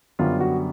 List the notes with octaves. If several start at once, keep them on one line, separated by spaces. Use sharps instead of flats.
F#2 D3 G3 B3 F4
F#4